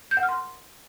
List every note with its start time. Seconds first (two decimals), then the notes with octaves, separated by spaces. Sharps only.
0.11 G6
0.17 F#5
0.23 F6
0.29 C6